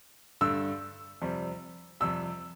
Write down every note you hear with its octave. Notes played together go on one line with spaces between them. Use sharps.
G2 D3 A3 E6
F2 C3 G3
F2 C3 G3 E6